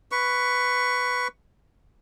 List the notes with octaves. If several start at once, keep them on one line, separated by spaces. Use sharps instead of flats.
B4 C#6